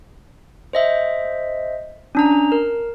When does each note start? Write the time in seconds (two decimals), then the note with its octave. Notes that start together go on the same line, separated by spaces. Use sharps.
0.73 C5 D#5 E5
2.15 C#4 D4 A#5
2.52 A#4